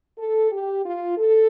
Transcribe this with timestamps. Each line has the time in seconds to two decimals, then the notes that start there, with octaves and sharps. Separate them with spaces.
0.18 A4
0.51 G4
0.85 F4
1.18 A4